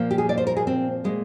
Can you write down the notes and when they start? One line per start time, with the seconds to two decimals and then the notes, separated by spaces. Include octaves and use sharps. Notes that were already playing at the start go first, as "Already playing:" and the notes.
Already playing: A#2 F3 A#3
0.11 G4
0.18 G#4
0.29 D5
0.37 C5
0.47 A#4
0.57 G#4
0.67 C4
1.04 A#2 G#3